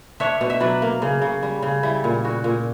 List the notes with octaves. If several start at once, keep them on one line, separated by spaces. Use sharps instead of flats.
D4 C#5 E5
B2
E5
F#3 B4 D5
A#3
C#3
C#3
G3
C#3
G3 E4
A#2
A#2 F#4
A#2